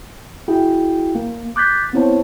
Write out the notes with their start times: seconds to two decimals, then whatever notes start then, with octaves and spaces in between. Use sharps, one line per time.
0.48 E4 F#4 G#4 G5
1.15 A#3
1.56 D6 F#6 G6 A6 B6
1.93 B3 C4 E4 C5 C#5 A5